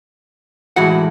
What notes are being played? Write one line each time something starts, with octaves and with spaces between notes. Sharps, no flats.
A2 E3 G#3 F#4 F#5